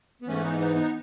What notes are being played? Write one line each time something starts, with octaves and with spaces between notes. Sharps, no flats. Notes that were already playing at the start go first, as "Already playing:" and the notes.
B3
G#2 E3 A3 C#4
B3 D#4
B3 D#4
B3 D#4